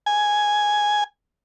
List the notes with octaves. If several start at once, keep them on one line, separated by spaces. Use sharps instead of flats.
G#5